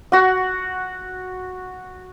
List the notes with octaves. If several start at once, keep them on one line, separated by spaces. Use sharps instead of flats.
F#4 F#5